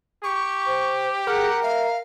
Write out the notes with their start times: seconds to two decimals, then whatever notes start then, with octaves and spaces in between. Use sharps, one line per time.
0.24 G4 C#6
0.67 C5
1.27 G#4 A#4 F#5
1.63 E5 F5